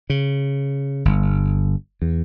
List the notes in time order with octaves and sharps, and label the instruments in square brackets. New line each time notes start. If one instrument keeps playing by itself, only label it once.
[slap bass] C#3
G1
E2